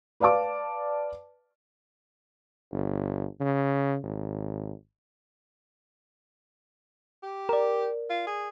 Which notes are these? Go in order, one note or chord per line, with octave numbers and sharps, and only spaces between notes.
B4 D5 F5 A5 D6
G1
C#3
G#1
G4
A#4 D5
F4
G#4